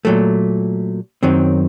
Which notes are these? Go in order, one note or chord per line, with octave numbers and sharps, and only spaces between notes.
A#2 F#3 A3
F#2 D#3 F#3 C4